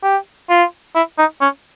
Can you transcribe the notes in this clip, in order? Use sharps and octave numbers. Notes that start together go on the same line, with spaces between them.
G4
F4
E4
D#4
C#4